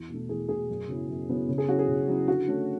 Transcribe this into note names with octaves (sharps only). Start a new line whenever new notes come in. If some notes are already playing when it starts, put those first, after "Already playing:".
Already playing: E2
B2 A3
E2 G#4
B2 A3 G#4
F#2
C#3 F#3 B3 E4
F#2
C#3 F#3 B3 E4
C#3
G#4
F#3 C#4 E4 F#4
G#4
C#3
F#3 C#4 E4
D3 F#4
A3 C#4